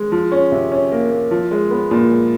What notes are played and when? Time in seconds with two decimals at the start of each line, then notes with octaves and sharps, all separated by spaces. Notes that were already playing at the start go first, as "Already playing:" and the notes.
Already playing: G#3
0.12 F3
0.32 C#4
0.52 C3
0.72 C#4
0.92 A#3
1.11 A#3
1.31 F3
1.51 G#3
1.71 B3
1.91 A#2
2.10 G#3